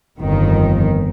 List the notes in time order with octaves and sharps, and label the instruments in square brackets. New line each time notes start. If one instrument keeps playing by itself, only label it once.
[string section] G1 F2 D#3